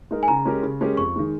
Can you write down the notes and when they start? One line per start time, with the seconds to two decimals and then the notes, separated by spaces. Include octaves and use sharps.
0.11 G#3 D#4 A#4
0.23 G#5
0.28 C#3 A#5
0.45 G#3 C#4 G4 A#4
0.63 C#3
0.81 G#3 C#4 G4 A#4
0.97 F2 C#6
1.16 D#3 G#3